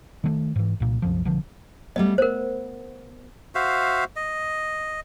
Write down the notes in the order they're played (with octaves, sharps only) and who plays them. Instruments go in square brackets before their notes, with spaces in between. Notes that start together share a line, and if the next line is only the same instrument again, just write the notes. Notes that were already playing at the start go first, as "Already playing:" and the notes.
[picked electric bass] D#3 F#3 A3
G#2 E3
C2 A#2
C2 F#2 F3
B1 D3 F3
[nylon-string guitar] G3 A3 B3 [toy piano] D#5
[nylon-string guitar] B3 [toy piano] A#4 C5
[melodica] F#4 C5 E5 F5
D#5